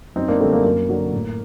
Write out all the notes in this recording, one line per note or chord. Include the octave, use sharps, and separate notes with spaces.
F#2 C4 D#4
A#3 D4
D3 G3 A3 C4
A#3
F#2 A#3
D3 F#3
A2